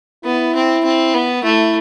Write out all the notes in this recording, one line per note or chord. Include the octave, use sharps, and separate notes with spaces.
B3 E4
C4
C4
B3
A3 E4